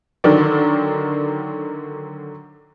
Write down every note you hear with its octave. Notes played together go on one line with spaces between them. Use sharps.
D3 D#3 F#3 D5